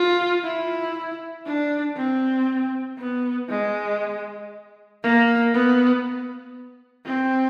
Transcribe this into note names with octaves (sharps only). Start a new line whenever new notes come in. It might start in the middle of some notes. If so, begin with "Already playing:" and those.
Already playing: F4
E4
D4
C4
B3
G#3
A#3
B3
C4